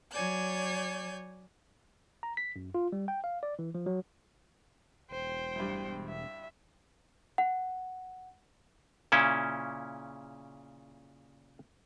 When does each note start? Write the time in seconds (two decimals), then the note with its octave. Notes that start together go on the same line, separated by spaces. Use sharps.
0.13 F#3 C#5 D5 G#5 G6
2.23 A#5
2.37 B6
2.56 F#2
2.75 F4
2.92 G3
3.08 G5
3.24 F5
3.43 D5
3.59 E3
3.75 F3
3.86 F#3
5.11 E1 C5 G5
5.55 C2 G2
6.09 E5
7.38 F#5
9.12 A#2 C#3 C#4 E4